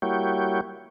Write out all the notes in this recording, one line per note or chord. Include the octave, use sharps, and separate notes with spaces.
G3 A#3 E4 F#4 C#5 G5